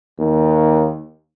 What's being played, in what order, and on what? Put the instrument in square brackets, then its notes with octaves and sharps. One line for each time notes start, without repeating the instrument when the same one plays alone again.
[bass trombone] D#2